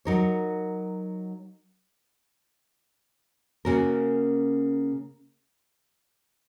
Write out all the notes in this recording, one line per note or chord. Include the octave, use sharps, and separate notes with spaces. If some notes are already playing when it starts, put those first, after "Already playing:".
F#3 D#4 A#4 C#5
C#3 A#3 C#4 F#4 A#4